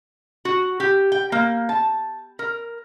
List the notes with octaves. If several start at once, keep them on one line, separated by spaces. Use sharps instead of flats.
F#4
G4
G5
A#3
A5
A#4